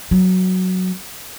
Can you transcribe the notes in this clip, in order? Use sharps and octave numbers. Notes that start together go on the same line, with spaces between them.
F#3